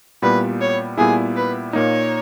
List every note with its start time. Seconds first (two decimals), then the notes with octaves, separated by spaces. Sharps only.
0.22 A#2 G3 B3 E4 B4
0.61 C#5
0.97 A#2 G3 B3 E4 G#4
1.36 B4
1.73 A#2 A#3 D#4 C#5